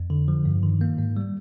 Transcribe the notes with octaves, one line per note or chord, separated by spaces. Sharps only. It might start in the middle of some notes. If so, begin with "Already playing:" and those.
Already playing: F2
D3
F3
G2
D#3
A#3
G#2
G3